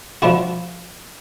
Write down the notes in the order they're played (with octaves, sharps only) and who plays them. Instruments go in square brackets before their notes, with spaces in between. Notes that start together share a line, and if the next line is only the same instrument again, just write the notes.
[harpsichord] F3 D4 E4 F#4